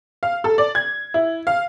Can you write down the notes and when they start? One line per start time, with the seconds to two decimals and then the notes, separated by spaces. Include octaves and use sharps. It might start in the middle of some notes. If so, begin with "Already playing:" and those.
0.23 F5
0.44 A4
0.58 D5
0.75 G#6
1.14 E4
1.47 F5